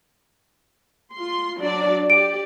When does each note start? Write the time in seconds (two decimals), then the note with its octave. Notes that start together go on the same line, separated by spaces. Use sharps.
1.12 F4 C6
1.59 F#3 D4 D5
2.10 G4 D5 D7